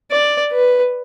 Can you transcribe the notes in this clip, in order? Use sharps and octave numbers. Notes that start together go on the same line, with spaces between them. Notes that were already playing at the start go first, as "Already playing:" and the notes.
D5
B4